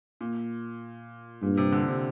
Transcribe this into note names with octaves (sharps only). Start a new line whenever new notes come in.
A#2
G2 A#2
C3
D3
C3